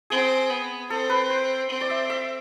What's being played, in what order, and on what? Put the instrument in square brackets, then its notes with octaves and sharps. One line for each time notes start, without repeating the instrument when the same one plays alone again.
[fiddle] C4 [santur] G#4
[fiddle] B3
[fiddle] C4 [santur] A4
[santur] B4
C5
[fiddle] C4
[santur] D5
E5
E5